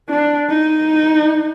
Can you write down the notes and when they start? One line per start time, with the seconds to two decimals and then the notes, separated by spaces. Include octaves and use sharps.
0.09 D4
0.49 D#4